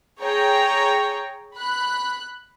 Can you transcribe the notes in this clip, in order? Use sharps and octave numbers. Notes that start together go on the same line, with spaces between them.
G#4 C#5 G5 A#5
B5 F#6